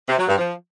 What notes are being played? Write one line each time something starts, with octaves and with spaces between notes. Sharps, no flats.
C3
F#3
G2
F3